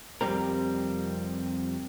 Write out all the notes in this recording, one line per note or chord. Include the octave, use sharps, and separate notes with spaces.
F2 C3 F3 G3 C4 A#4